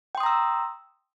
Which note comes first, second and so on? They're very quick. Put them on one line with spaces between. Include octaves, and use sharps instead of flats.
G5 C6 D#6 A#5 E6